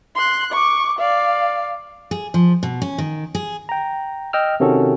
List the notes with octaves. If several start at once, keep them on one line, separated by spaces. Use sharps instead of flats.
C6 F#6
C#6 D6
D5 F5
G#4
F3
B2
C#4
D#3
G#4
G5 A#5
D#5 G5 E6 F6
C3 D#3 C#4 F#4 A4